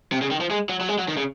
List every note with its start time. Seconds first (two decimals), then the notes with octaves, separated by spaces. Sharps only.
0.12 C3
0.22 C#3
0.31 D#3
0.41 F3
0.51 G#3
0.69 F#3
0.81 F#3
0.88 G#3
0.99 F#3
1.08 D#3
1.17 C#3